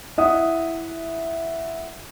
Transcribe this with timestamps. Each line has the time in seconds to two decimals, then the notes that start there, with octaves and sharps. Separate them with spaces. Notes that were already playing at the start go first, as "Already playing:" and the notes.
0.18 E4 E5 F#5 D#6